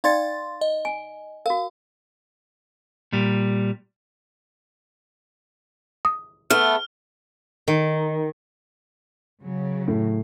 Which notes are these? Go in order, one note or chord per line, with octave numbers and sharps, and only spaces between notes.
D#4 D5 F5 G5 C6 A6
D#5
G#5
F#4 A#4 F5
A#2 G3
D#6
A3 B3 F6
D#3
C#3 F#3
A2